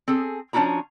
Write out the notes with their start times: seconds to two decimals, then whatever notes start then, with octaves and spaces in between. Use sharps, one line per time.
0.08 C4 G#4 A4
0.53 F3 C#4 D4 E4 F#4 A#5